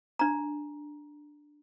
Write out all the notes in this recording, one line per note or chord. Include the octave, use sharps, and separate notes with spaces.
D4 A#5